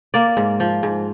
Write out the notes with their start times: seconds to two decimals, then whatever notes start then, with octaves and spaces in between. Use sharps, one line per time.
0.14 A#3 D5
0.37 G#2
0.60 F3
0.83 G#2